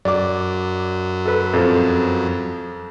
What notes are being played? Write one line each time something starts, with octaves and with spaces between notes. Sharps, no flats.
F#2 D5 D6
A4 B4
F2 F3